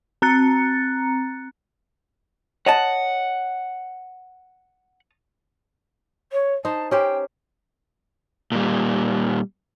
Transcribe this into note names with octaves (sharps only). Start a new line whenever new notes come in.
C4 A#5 F#6 A6 C#7
C#5 D#5 F#5 A5
C#5
D#4 C5 A5
C#4 G4 C5 G5
A#2 G3